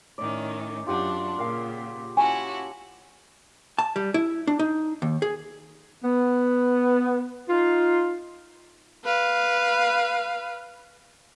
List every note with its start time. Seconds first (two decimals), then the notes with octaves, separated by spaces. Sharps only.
0.18 A2 D#3 C#4 D5
0.86 F#2 D4 F4 G4 F#5
1.38 A#2 C#3 A#4 F5
2.17 C#4 E4 F#4 G#5 A5 C#6
3.79 A5
3.96 G3
4.14 E4
4.47 D4
4.59 D#4
5.02 D#2
5.22 G#4
6.04 B3
7.49 D#4 F4
9.05 B4 F5